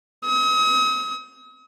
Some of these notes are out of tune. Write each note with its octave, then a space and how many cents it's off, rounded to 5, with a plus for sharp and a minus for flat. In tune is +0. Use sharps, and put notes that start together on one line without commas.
D#6 +40